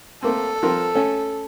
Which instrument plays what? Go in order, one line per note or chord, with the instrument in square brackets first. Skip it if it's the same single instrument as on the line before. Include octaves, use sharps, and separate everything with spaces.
[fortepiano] A3 A#3 C4 [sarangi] A4
[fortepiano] F3 C4 A#4
A3 C#4